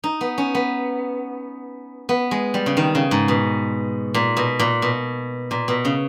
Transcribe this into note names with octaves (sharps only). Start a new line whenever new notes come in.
D#4
B3
C#4
B3
B3
G#3
G3
C#3
D#3
C#3
G#2
B2
A#2
B2
A#2
B2
A#2
B2
C#3